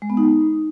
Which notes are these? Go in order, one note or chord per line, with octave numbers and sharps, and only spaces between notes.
G#3
B3
D#4